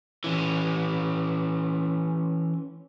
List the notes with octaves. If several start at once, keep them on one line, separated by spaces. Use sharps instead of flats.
E3 C#4